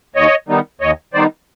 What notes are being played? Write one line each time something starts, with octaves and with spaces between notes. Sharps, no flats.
D#2 C#5 D#5
D#3 G3 B3 D#4
D#2 C#5 D#5
D#3 G3 B3 D#4 C5 D5